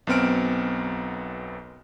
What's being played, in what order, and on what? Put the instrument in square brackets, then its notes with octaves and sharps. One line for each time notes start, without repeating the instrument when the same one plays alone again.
[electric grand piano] B1 F#2 B3 C4 F6 D7